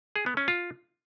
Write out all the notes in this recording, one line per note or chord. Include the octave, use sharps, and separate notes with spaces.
G#4
B3
C#4
F4